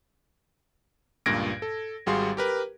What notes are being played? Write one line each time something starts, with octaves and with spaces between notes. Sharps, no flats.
C#2 G2 A#2 G#6 A#6 D7
A4
G#1 G3 F#4 G#4 F5 C6
G4 A#4 B4